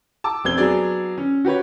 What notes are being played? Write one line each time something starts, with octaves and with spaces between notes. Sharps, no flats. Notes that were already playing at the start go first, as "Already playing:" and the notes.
A5 D6 E6
F1 C4 E6 G#6 G7
F#3 B3 D4 G#4 D5
C#4
F#4 G4 B4 C#5